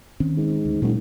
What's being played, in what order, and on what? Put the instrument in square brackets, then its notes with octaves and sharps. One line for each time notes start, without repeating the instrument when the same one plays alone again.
[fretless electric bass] D#3 C4 C#4
[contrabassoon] G#2
[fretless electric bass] D2
[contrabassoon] F#1 [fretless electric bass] A#2 G#3